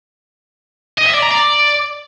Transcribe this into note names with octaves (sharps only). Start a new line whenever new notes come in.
D#5
E5
D5
A#5
D5